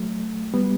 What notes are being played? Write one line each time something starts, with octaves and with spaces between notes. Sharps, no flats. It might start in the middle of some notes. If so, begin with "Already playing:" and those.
Already playing: F#3 A3
G3 B3